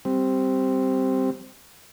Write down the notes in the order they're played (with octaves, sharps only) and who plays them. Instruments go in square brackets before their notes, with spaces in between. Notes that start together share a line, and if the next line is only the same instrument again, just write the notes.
[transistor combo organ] G3 C4